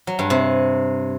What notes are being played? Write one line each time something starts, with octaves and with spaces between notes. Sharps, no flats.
F#3
G2
C3